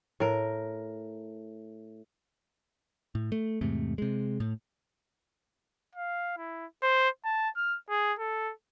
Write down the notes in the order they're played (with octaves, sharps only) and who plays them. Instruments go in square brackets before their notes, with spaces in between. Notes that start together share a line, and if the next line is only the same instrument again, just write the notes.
[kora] A2 A#4
[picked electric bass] A2
A3
E2 G#2 C3 A3
C3 G#3
A2
[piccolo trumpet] F5
E4
C5
A5
F6
G#4
A4